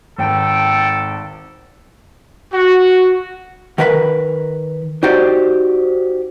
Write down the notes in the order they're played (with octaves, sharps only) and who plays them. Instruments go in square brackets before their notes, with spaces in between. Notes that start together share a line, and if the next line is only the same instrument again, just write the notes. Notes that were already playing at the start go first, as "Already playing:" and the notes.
[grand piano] G#1 [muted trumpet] A4 [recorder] G5
[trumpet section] F#4
[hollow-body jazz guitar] D#3 A#4 B4 F5 B5
D#4 F#4 G4 C5 D5